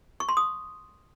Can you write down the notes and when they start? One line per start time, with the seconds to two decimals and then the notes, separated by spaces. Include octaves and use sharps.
0.20 C#6
0.29 C6
0.37 D#6